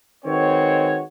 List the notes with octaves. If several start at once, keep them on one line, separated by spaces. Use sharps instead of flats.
D#3 G#3 C4 F#4 B4 C#5